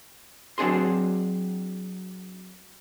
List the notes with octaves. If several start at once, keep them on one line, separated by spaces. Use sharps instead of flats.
F#3 C4 D4 G#4 C6